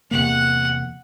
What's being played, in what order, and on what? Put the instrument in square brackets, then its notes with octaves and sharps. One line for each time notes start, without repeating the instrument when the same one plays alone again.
[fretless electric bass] E2 C3 A#3 [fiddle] F#5